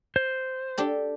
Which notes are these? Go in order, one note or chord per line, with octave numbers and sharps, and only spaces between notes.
C5
D4 G4 A4